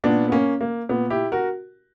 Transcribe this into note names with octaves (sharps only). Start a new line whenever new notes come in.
A#2 B3 D4
B3
A#3 C#4
A#3
A#2 B3
E4 G4
F#4 A#4